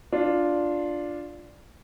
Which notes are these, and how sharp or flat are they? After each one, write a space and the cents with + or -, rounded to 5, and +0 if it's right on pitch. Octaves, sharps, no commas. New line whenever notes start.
D4 +0 F4 +0